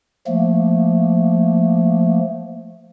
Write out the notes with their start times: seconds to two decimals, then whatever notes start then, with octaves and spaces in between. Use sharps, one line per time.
0.27 F3 A3 A#3